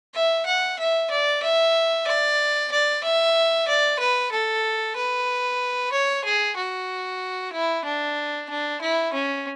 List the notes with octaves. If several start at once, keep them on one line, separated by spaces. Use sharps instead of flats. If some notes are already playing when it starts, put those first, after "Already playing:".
E5
F#5
E5
D5
E5
D5
D5
E5
D5
B4
A4
B4
C#5
G#4
F#4
E4
D4
D4
E4
C#4